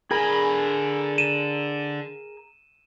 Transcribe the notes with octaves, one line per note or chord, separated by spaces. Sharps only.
D3 G#4 A#4 G#5 B5
D#7 E7